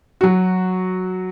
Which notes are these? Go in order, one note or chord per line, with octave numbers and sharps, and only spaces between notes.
F#3 F#4